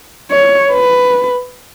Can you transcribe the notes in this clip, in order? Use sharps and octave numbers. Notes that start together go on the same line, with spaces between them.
C#5
B4